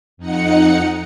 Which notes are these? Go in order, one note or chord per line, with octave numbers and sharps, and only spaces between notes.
F2 D#4 F#5 C#7